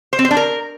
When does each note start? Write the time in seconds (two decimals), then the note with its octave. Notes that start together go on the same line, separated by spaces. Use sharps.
0.13 C5
0.19 C4
0.25 C5
0.31 D4
0.37 A#4